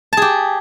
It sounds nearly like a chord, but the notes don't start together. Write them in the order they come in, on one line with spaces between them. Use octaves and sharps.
A5 G#4 G4